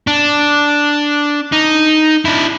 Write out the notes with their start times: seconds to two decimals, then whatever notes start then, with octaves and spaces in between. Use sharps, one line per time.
0.07 D4
1.52 D#4
2.25 D4 E4